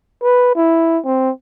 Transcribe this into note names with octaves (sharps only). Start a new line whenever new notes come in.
B4
E4
C4